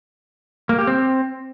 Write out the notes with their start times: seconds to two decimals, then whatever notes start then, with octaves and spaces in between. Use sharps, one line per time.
0.69 A#3
0.78 G4
0.87 C4